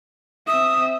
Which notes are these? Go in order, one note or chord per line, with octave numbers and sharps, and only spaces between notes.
C4 E5 D#6